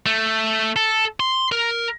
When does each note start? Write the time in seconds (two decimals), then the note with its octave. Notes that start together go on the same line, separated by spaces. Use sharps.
0.06 A3
0.76 A4
1.20 C6
1.52 A#4